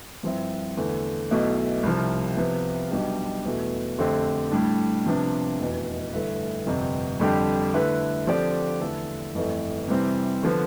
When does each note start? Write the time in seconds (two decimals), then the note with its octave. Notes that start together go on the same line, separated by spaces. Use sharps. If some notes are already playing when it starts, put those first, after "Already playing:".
0.23 G2 F3 C4 E4
0.77 E2 D3 A3
1.31 B1 B2 A3 E4
1.83 C2 C3 F3
2.37 C3 F3 B3
2.91 B1 B2 G3 D4 G4
3.45 E2 B2 A3
3.99 F2 D3 A3 C4 G4
4.51 A2 G3 D4
5.06 C3 F3 B3 D4
5.59 F1 E2 B2
6.12 G2 D3 A3 E4 B4
6.66 G1 F2 C3
7.20 F2 D3 G3 D4 G4
7.74 D3 A3 E4 B4
8.27 D3 F3 C4 G4 D5
8.80 E2 D3 A3 E4 A4
9.34 G1 F2 E3 A3
9.88 C3 E3 G3 C4
10.43 D3 F3 B3